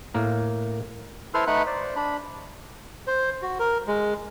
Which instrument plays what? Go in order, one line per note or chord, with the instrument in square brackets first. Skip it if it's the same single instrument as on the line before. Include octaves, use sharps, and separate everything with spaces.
[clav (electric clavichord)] A2 A#3 A#4
[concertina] E4 A4 B4 C5 C6 F6
A3 D#4 B4 F#5 B5 F#6
C5 D5
D4 B5
[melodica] C5
F#4
A#4
G#3